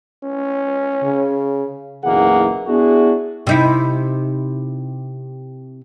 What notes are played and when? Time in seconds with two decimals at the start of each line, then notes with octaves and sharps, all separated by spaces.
0.24 C#4
1.04 C#3
2.04 F#1 B1 E3 A#3 G#4 F#5
2.67 B3 D4 E4 F#4 G#4
3.47 C3 D#4 E4